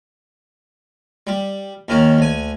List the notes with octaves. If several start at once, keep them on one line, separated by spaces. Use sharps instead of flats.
G3
D#2 D#3 C#4
D2 G#5